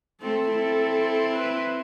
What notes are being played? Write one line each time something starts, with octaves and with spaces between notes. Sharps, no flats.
A3 C4 A4
C4 E4
B4